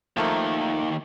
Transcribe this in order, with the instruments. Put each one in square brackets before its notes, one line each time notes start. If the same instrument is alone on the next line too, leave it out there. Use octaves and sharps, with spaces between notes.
[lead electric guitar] D#2 D#3 [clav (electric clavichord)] F3 A3 A#3